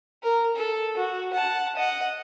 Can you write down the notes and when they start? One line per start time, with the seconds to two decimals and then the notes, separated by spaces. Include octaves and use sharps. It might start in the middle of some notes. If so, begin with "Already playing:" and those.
0.23 A#4
0.56 A4
0.97 F#4
1.33 F#5 A5
1.76 D#5 F#5